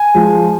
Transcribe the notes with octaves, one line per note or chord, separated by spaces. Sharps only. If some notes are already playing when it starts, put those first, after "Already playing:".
Already playing: G#5
F3 G#3